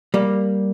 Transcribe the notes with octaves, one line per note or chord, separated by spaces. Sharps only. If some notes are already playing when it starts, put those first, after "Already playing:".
G3 A#3